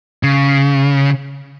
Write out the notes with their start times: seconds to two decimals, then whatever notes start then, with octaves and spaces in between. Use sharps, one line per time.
0.23 C#3